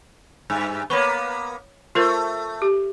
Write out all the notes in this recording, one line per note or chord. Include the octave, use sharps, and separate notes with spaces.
G2
A#3 B3 C#5 B5 C#6
A3 F4 A#4 C5
G4